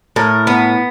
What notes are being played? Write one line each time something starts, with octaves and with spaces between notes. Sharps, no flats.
A2 A#4
B3